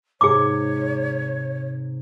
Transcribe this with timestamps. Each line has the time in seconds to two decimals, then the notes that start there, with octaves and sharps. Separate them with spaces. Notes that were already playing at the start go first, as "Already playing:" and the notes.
0.21 G#2 C3 G#4 C#5 D6